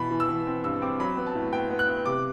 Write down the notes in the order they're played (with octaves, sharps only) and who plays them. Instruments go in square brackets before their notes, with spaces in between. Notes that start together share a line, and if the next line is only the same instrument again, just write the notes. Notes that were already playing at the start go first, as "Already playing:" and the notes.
Already playing: [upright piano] B2 E3 B5
E3
E6
E3
C4
G2 E6
C4 D6
F#3 B5
B3
A5
A2
B3 G5
B3
F#6
B3
C3 D6